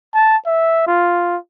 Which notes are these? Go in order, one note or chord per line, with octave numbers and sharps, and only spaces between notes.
A5
E5
F4